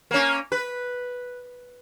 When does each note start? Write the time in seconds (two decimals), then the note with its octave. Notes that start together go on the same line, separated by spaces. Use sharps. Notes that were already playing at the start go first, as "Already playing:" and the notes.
0.11 A#3 C#4
0.52 B4